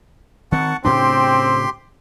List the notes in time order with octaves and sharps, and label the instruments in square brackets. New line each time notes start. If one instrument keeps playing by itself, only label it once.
[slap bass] D#3 C4 [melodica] F#5 A5 C#6
[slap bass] A2 C#3 D4 [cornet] C4 [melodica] G4 C6